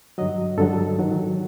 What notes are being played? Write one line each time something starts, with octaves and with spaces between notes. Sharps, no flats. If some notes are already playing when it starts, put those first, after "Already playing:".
G2 D3 F#3 D#5
G2 D3 F#3 A4
G#2 D#3 F#3